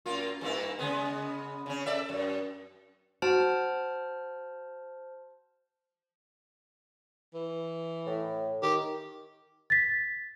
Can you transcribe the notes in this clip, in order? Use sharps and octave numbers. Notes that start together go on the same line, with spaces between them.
F#2 A#3 F4
G2 A#3 E4
C#3 G#3 B3
C#3 C#4
A4 D5 E5
F#2
F#4 C5 A5 F6
E3
A2
D#3 G4
A6 B6